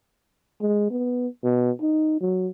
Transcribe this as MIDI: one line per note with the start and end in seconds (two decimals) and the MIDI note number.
0.61 0.90 56
0.91 1.28 59
1.44 1.71 47
1.81 2.19 63
2.21 2.49 54